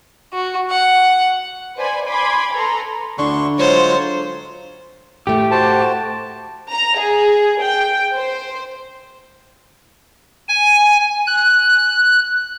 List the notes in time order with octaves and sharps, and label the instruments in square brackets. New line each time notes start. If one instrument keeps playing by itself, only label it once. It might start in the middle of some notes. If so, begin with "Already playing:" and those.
[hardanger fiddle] F#4
F#5
[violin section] B4 C5 D5 G#5 B5
G#5 B5 C6 D6 G#6
A4 B4 A#5 C6
[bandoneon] D2 C6 C#6 [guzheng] D3 D4 E4
[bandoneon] F#3 G#3 F4 [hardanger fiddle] C5 C#5
[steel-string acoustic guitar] A2 A3 [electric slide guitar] G4
[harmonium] F#4 C5 [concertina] A5
[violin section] A#5
G#4
G5
C5
[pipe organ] G#5
F#6